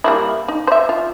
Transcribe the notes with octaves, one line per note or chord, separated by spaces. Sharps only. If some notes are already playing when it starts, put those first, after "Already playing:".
G3 A#3 E4
D#4
C5 E5
F4